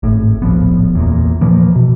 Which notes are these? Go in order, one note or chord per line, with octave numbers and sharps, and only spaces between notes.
G#1 A2
D1 A#1 F3 B3
E2 A#2
A#2 E3 F3 A#3
B2